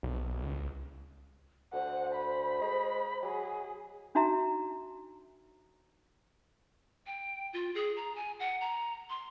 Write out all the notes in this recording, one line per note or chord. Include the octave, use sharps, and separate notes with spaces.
B1
C#2
D2 C5 F#5
B5
G#3
F#3 G#4
D4 D#4 F#4 E5 A#5
G5
F4
G#4
A#5
G#5
F#5
A#5
C6